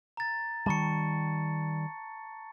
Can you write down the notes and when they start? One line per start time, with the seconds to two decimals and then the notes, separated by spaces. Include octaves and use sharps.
0.17 A#5 A6
0.66 D#3 G3 A5 C#6 C#7